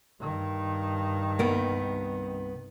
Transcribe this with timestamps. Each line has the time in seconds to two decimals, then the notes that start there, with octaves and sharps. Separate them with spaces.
0.21 G2 D#3
1.39 C2 A#3 B3